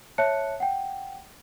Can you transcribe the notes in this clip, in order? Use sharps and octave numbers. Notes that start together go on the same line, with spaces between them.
C#5 E5 A5 F#6 C#7
F#5 G5